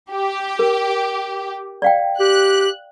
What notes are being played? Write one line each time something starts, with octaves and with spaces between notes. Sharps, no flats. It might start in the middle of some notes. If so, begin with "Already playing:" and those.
G4
A#4
D5 F5 G5
G4 F#6